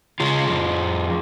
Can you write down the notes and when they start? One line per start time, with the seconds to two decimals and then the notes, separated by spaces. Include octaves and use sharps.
0.20 C#3 F4 G#4
0.50 F2